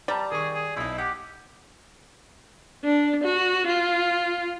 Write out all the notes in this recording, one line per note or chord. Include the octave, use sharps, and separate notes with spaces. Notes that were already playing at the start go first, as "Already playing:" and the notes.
G3 A5 A#5 A6
D#3 G#4 C#6
G#4
B1 D#4 E4
G4 F#5 D6
D4
F#4
F4